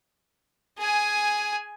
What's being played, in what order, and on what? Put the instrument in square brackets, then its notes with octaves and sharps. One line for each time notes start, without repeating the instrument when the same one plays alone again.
[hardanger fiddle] G#4 G#5